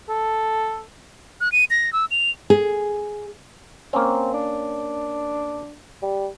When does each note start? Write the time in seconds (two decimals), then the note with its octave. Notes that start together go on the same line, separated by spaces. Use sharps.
0.09 A4
1.41 F#6
1.52 D#7
1.70 A#6
1.93 E6
2.11 F7
2.50 G#4
3.93 A#3 C4 C#4
4.34 D4
6.02 G3